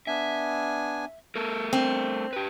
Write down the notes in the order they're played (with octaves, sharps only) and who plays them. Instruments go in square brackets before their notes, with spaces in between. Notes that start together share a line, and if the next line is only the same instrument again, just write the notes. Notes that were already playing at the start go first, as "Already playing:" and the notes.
[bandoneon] B3 D4 G#5 [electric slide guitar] E5
[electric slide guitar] A3 A#4 [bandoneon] A4
[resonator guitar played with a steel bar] C4 [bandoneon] D4
[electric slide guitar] G4 B4